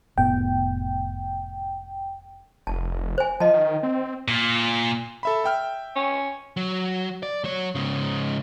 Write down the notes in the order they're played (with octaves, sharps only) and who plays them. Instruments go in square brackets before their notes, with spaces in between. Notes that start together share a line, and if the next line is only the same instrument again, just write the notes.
[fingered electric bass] F1 A2 B3 [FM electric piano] G5
[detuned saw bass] F1 [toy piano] A5
[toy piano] C5 G#5
[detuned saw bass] F3 [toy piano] D#5 A5
[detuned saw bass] D#3
C4
[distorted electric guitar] A#2
[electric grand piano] A4 E5 B5
E5 G5 F6
[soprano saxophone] C#4
[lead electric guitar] F#3
D5
F#3 C#5
G#2 C#3